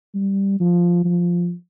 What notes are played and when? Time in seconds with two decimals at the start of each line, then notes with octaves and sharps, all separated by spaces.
0.15 G3
0.60 F3
1.05 F3